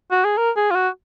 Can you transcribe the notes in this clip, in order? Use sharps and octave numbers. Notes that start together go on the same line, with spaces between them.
F#4
G#4
A#4
G#4
F4
F#4